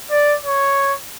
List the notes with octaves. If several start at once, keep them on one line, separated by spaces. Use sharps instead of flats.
D5
C#5